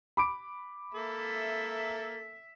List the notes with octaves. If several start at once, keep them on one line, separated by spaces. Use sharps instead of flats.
B5 D6 D7
A#3 A4 E5